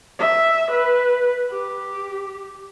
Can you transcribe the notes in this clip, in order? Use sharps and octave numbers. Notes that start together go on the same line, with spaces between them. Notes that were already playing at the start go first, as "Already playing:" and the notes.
E5
B4
G4